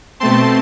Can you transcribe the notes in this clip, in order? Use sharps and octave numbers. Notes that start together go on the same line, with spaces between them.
B2 A3 C4 A5 C6